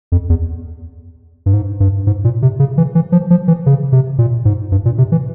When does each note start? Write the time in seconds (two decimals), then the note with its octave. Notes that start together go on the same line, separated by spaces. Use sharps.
0.12 F2
0.30 E2
1.46 G2
1.53 G#2
1.80 G2
2.07 G#2
2.24 A#2
2.42 C3
2.60 C#3
2.78 E3
2.95 E3
3.12 F3
3.30 F3
3.48 E3
3.66 C#3
3.92 C3
4.18 A#2
4.45 G#2
4.72 G2
4.85 A#2
4.98 C3
5.12 E3